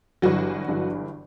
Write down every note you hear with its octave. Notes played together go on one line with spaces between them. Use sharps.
G1 G2 E3 F#3 F#4
G1 G2 E3